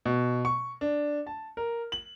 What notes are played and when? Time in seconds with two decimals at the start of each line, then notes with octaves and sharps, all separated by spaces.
0.05 B2
0.45 C#6
0.81 D4
1.27 A5
1.57 A#4
1.92 F#7